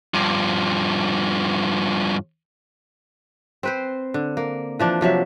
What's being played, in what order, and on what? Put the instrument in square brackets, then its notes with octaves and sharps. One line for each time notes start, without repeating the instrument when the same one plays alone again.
[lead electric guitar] G2 F3
[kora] C4 B4 C5
D3
A#3
E3 F3 D4
C3 F3 F#3 E5